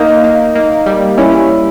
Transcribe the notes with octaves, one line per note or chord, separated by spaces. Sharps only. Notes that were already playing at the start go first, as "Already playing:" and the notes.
Already playing: A#3 D#4
A#3 D#4
A#3 D#4
G3
C#4 E4